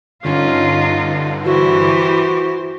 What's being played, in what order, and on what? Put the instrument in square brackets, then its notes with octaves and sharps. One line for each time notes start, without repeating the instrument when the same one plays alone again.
[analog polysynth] G2 D3 [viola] C#4 [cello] D#4 F4
[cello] E3 G4 [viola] E4 C5 [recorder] F#4